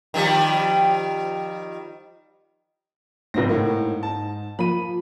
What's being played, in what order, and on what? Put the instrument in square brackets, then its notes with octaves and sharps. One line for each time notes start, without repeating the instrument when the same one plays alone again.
[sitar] D#3 F3 G3
[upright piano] F#1 C4 A#6 [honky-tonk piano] G#2
[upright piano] A2 A#3
A5
[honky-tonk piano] F3 A#3 [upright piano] B5 D#7